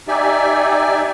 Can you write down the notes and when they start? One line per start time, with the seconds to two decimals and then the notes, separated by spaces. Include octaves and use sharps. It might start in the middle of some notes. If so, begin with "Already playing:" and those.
0.08 D#4 G4 D5 E5 G#5